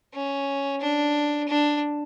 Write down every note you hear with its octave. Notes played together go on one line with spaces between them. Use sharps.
C#4
D4
D4